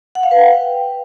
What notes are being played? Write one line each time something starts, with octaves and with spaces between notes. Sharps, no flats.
F#5
F5
B4
G5